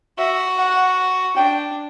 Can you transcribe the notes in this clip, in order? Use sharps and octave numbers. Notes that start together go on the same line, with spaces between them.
F#4 E5
F#5
D4 G5